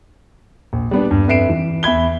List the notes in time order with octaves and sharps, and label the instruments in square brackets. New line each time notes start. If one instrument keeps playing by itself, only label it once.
[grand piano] A#1
G3 B3 D4
G2
F2 B4 E5 C7 D7 E7
E3
E2 E5 B5 G#6 G7